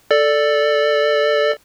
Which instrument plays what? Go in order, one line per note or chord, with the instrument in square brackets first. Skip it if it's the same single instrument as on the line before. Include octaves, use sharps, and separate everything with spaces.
[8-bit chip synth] A4 D5